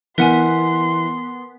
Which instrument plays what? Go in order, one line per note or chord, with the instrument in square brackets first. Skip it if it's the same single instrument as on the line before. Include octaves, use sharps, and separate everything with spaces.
[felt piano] E3 [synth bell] B3 [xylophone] A#4 F#5 G#5 [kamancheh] C6